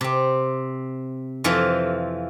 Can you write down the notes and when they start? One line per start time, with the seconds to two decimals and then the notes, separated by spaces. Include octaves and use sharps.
0.01 C3 C4
1.44 F2 E3 F3 F4 E5